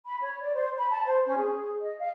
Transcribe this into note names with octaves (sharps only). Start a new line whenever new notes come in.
B5
C#5
D5
C5
B5
A5
C5
C#4
G#4
D#5
F5